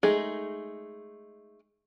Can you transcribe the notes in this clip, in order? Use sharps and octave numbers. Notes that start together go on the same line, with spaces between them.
G#3 A3 D#4 G#4